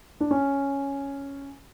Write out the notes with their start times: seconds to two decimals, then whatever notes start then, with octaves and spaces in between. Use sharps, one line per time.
0.20 D4
0.31 C#4